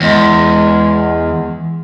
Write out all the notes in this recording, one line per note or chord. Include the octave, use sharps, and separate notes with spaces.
E2 G#3